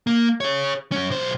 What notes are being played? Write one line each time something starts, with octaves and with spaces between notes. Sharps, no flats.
A#3
G#4 C#5
F#3 C#4
B1 C5